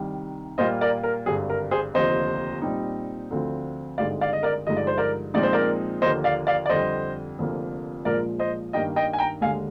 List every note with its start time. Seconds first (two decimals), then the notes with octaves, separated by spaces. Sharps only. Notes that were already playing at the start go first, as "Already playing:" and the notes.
Already playing: C2 C3 D#3 G3
0.58 A#2 G3 A#3 F4 C5 D#5
0.81 A#4 D5
1.04 A#4
1.26 G#1 G2 D3 G#4
1.50 A#4
1.71 G#4 C5
1.94 F1 D#2 D3 F3 C4 C5 D#5
2.62 A#2 G3 C4 D#4
3.31 D2 D3 F3 C4 F4
3.98 G#1 G2 D3 G#3 D#4 D5 F5
4.21 D5 F5
4.33 D#5
4.43 A#4 D5
4.67 G2 D3 F3 G#3 D#4 D#5
4.77 D5
4.87 C5
4.98 A#4 D5
5.34 A#2 F3 G#3 C4 D#4 D5
5.43 C5
5.53 A#4 D5
6.02 D#2 D3 F3 A#3 C5 D#5
6.24 D5 F5
6.47 D5 F5
6.66 D5
6.69 F2 D3 G3 C5 D#5
7.39 F1 F2 D3 F3 A#3
8.05 A#1 A#2 F3 G#3 A#4 D5
8.39 C5 D#5
8.73 G2 D#3 G3 A#3 D4 D#5 G5
8.96 D#5 G5
9.13 G#5
9.19 G5 A#5
9.41 D#2 D3 G#3 F5 G#5